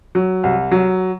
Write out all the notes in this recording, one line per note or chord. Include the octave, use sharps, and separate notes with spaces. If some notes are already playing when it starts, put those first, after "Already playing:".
F#3
C2
F#3